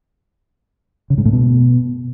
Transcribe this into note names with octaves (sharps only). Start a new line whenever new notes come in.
C#3
G#2
A2
B2